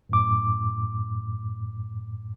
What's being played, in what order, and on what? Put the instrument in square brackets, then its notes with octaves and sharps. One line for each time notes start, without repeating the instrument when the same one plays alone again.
[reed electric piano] F#2 A2 D6